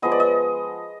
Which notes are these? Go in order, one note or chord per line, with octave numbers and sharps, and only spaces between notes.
F3 G#3 B3 D#5
D5
D#5